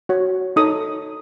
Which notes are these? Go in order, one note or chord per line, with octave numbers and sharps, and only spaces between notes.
F#4 C#5
D#4 A4 C#5 D#6